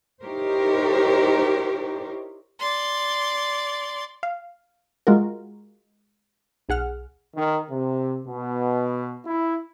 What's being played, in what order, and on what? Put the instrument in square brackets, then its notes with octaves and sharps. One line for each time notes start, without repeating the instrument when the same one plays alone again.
[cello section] D#4 E4 G4 A#4 C5 C#5
[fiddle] D5 C6
[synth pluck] F5
G#3 F4 F#4 A#4
B1 G#4 F#5 F6
[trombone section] D#3
C3
B2
E4